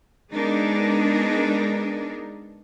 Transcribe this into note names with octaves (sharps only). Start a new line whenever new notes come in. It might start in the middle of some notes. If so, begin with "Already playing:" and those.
G#3 B3 D4 D#4 G#4 A#4